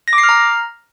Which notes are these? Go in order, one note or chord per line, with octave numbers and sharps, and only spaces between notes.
A#6
D6
C7
F6
A#5